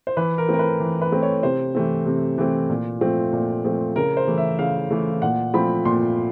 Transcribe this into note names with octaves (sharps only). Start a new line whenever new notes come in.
C5
E3 B4
A#4
A3 C4 A#4
B4
E3
B4
A3 C4
C#5
C3 C5
E3 A3 C4
C3
E3 A3 C4
A#2
F3 A3 C4
A#2
F3 A3 C4
C#3 A#4
C5
E3 A3
E5
C#3 F5
E3 A3
A#2 F#5
F3 A3 C4 B5
A#2 C6